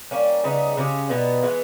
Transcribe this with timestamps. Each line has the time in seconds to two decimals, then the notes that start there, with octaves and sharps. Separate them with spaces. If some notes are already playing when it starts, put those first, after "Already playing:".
0.11 G3 A#3 C#4
0.44 C#3 G3 B3 D#4
0.77 C#3 G#3 C#4 G4
1.09 B2 G3 B3 D#4
1.43 E3 G#3 B3